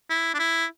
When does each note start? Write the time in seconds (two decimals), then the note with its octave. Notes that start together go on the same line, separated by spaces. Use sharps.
0.10 E4
0.34 D4
0.39 E4